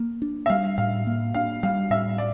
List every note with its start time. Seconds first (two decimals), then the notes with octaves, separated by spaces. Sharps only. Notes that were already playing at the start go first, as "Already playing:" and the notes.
Already playing: A#3
0.22 D4
0.46 E5
0.50 G3 F5
0.78 A2 F5
1.07 A#3
1.34 D4 F5
1.63 G3 F5
1.90 A2 E5
2.18 D5